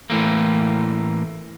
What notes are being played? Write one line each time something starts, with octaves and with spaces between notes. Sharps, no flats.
A2 E3 A3 A#3